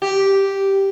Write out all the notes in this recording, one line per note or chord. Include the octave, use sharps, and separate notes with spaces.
G4